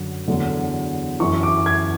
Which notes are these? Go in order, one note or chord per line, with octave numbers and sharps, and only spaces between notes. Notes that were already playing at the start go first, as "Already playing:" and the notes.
Already playing: F#2 D3 F#3
E2 D3 F#3
F#2 E3 C#6
D6
G#6